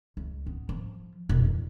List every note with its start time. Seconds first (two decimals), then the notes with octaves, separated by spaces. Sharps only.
0.17 C#2
0.47 B3
0.69 F3
1.29 E1
1.45 E2